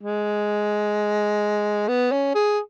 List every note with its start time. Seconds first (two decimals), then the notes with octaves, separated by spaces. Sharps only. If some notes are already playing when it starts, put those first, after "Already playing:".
0.03 G#3
1.88 B3
2.12 C#4
2.35 G#4